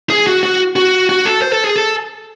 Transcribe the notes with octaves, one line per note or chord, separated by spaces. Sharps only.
G#4
F#4
F#4
F#4
F#4
A4
C5
A4
G#4
A4